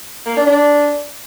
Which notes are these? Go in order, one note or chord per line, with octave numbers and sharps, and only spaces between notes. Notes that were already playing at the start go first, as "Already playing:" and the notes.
A#3
D4
D4